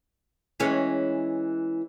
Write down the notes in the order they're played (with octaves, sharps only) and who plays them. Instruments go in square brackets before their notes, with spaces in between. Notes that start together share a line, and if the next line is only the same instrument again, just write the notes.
[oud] E3 G#3 C#4